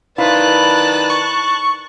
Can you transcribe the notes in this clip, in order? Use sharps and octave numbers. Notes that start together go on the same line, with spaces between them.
D#3 E4 B4 C5 D5 F5 A5 F#6
C#6